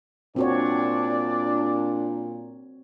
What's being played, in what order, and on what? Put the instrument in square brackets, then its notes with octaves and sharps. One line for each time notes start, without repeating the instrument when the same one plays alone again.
[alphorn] A#2 [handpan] C4 F#4 C#5 [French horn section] D4 [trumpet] D5